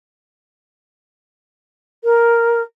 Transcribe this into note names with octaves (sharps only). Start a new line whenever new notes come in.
A#4